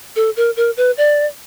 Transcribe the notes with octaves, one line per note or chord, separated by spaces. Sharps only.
A4
A#4
A#4
B4
D5